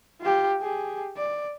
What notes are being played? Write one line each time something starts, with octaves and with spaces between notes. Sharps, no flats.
F4 G4
G4 G#4
D5